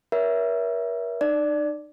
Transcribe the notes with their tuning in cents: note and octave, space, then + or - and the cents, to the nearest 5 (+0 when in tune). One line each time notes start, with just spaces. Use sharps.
A#4 +40 C#5 +30 E5 +0
D#4 -40 D5 +0